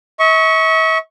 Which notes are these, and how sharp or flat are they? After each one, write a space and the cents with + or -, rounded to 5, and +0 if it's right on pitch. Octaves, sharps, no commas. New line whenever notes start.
E5 -45 C#6 +0